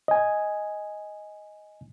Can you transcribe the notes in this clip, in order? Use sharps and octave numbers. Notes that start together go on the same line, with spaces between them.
D#5 G#5